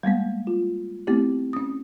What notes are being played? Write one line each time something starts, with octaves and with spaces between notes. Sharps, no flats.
G3 G#3 A#3 B3
F4
A3 B3 C4 E4 G4
C#4 D#6